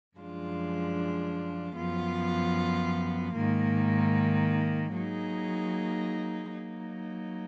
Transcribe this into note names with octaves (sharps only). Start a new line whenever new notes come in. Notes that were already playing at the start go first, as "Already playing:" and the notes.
F#2 F3 G#3 D4 F4
F#2 F3 B3 F4
G#2 D#3 A#3
F#3 A#3 D#4 G#4
F#3 A#3 D#4